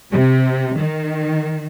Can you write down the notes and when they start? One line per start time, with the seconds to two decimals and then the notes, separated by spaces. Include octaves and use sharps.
0.11 C3
0.76 D#3